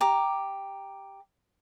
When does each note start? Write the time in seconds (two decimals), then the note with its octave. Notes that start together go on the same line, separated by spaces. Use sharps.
0.01 G4 A#5 D6